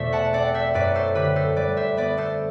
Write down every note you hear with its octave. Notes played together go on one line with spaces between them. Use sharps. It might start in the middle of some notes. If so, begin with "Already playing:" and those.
Already playing: E2 B2 A3 A4 C5 D5 E5
F#5 A5
C4 D5 F#5
C5 E5
F#2 B4 D5
A4 C5
D3 G4 B4
A4 C5
G3 B4 D5
C5 E5
B3 B4 D5
A4 C5